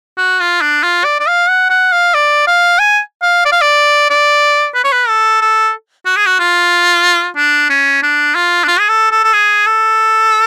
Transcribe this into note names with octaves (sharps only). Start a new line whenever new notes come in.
F#4
F4
D4
F4
D5
D5
F5
F#5
F#5
F5
D5
F5
G#5
F5
D5
F5
D5
D5
B4
C#5
B4
A4
A4
F#4
G#4
F#4
F4
D4
C#4
D4
F4
D4
F4
G#4
A4
A4
A4
G#4
A4